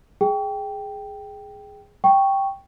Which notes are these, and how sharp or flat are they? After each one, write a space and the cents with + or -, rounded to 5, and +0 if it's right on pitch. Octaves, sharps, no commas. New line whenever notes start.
G#4 +5 G5 +0
G5 +0 C#6 +0